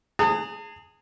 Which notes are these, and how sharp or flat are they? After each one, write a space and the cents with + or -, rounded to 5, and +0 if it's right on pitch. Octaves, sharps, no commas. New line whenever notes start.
G#4 +0 A5 +45 D#6 -10